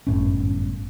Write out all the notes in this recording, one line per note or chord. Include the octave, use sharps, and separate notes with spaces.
G1 F#2 A2 C#4